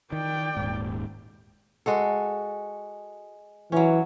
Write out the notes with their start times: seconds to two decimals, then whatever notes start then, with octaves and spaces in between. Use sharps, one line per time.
0.12 D#3 D5 G5
0.57 D#1 G#2
1.86 G#3 F#4 A4
3.72 E3 F#3 C#4